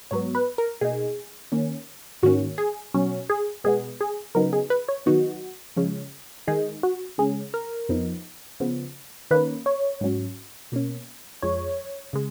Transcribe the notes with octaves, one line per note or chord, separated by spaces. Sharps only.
G#2 F#3 B3 C#5
B4
A#4
B2 A#3 D#4 G#4
D#3 A#3 C#4
G#2 D#3 A#3 C#4 F#4
G#4
B2 F#3 C#4
G#4
B2 G#3 B3 G#4
G#4
C#3 F#3 B3 D#4 A#4
G#4
B4
C#5
D#3 F#3 B3 D#4 F#4
C#3 F3 G#3 C#4
D#3 G#3 D#4 G#4
F#4
C#3 G#3 C#4 G#4
A#4
F2 F3 B3 D#4
C#3 F3 B3
D#3 A#3 C#4 B4
C#5
G#2 F#3 C#4
B2 A#3 C#4
F2 F3 G#3 C#5
C#3 G#3